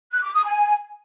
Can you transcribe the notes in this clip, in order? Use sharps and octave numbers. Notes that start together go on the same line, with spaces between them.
F#6
D6
D#6
G#5